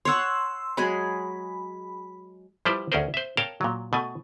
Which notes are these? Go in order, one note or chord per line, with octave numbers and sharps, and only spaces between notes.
C#5 F#5 C6 C#6 E6
F#3 G#3 G#4 B5
F3 G3 E4 G4 B4 C5
D2 C#4 G#4 A#4 C5
C5 E5
A#4 C#5 F5 G5 A5
A#2 F#3
B2 A3 G#5